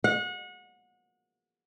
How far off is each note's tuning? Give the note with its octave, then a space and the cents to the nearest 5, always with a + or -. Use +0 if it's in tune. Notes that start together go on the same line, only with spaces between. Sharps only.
F#5 -30